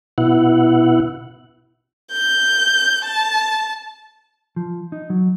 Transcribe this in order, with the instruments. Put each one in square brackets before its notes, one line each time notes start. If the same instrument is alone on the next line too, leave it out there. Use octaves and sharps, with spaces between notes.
[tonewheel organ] B2 E4 F#5
[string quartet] G6
A5
[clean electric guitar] F3
D#4
F#3